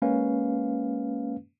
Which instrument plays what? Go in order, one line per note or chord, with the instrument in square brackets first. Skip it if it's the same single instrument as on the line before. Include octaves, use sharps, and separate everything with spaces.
[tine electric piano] G#3 A#3 C#4 B4 F5